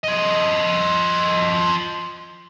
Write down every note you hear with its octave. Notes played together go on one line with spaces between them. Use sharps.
F3 D#5